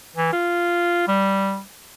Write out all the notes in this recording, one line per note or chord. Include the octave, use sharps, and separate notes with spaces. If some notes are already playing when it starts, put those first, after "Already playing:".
E3
F4
G3